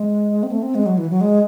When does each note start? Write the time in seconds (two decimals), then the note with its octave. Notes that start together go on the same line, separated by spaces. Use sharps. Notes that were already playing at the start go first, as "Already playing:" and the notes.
Already playing: G#3
0.43 C4
0.52 A3
0.63 C4
0.75 G#3
0.86 F#3
0.98 E3
1.10 F#3
1.21 G#3